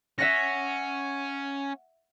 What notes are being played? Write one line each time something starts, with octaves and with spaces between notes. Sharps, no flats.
C#4 E5 F#5 A#6